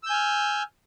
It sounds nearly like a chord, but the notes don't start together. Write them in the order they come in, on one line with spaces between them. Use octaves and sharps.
E6 G6 G#5 F6